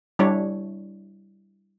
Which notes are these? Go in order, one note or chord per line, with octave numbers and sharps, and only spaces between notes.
G3 D4 E4 C#5